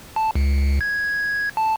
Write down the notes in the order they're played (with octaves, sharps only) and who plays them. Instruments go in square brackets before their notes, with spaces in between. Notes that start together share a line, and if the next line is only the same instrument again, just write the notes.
[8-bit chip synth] A5
C#2
G#6
A5